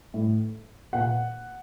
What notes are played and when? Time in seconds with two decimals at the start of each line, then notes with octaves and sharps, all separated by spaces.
0.14 A2
0.93 A#2 F#5